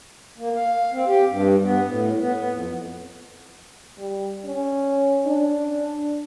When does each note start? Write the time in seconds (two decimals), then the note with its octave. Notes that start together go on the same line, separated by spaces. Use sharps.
0.38 A#3
0.55 F5
0.92 C4
1.07 G4
1.28 G2
1.63 B3
1.86 A2
2.19 B3
2.37 B3
2.49 F2
3.98 G3
4.45 C#4
5.26 D4